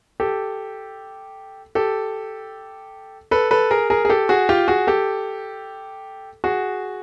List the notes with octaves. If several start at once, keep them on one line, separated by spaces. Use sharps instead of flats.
G4 A4
G4 A4
A4 B4
A4 B4
G#4 A#4
G#4 A#4
G#4
G4 A4
F#4 G#4
F4 G4
F#4 G#4
G4 A4
F#4 G#4